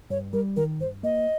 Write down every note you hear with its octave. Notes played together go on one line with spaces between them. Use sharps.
G2 C#5
G3 A#4
D#3 A#4
G2 C5
A#3 D#5